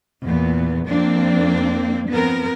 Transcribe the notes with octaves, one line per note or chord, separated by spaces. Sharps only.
E2 A#2 B3
F2 A#3 C4 D4
F3 B3 C4 A#4